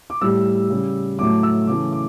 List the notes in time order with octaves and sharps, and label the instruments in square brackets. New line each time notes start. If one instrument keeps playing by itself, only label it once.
[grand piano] D6
A2 G3 E6
C#3 G3
A2 F#3 A3 D6
E6
C#3 E3 A3 D6
D6